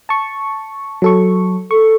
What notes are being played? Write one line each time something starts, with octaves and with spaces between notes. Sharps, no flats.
A5 C#6
F#3 A4 C#6
A4 C#6